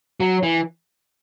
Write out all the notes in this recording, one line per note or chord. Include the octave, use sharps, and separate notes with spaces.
F#3
E3